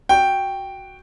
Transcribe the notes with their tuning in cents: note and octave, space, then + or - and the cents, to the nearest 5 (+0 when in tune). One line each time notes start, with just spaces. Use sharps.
F#4 +0 G5 +0